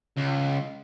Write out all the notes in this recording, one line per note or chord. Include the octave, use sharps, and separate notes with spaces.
C#2